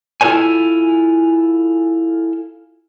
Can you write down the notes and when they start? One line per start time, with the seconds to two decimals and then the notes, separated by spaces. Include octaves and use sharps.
0.21 E4 F4 A4 C5 C#5 G#5